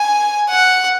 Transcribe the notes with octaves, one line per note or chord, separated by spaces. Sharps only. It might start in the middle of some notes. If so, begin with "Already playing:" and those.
Already playing: G#5
F#5